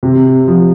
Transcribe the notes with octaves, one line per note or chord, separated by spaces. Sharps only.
C3
F3